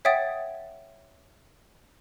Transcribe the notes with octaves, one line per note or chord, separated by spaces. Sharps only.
C#5 E5 F#5 G5 D#6 A6